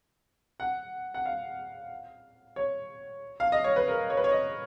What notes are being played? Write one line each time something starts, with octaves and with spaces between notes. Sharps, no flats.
F#5
F#5
F5
C#5
F5
D#5
C#5
B4
A#4
C#5
B4
C#5
D#5